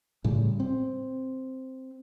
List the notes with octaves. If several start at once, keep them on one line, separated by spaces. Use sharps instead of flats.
A2 C#3 G3
C4